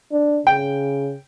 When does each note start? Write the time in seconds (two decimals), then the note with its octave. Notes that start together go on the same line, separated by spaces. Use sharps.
0.12 D4
0.47 C#3 G5